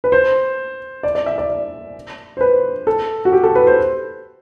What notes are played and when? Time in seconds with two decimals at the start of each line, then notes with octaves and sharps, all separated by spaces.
0.04 B4
0.12 C5
1.03 D5
1.15 D5
1.26 E5
1.38 D5
1.49 D5
2.37 C5
2.41 B4
2.87 A4
3.25 F#4
3.32 G4
3.43 A4
3.55 B4
3.67 C5